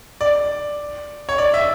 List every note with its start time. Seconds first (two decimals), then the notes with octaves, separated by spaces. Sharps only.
0.21 D5
1.29 C#5
1.38 D5
1.54 E5